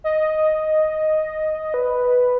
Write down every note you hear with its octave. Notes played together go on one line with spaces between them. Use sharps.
D#5
B4